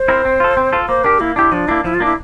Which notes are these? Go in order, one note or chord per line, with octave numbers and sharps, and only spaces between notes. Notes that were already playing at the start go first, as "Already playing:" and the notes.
Already playing: C5
C4 E4 A#4
C4
F4 A4
C4
F4 A4
A#3 C5
D4 G4 A#4
A#3 E4
D4 E4 G4
F3 D4
A#3 D4 E4
F3 E4
F4
A#3 D4 E4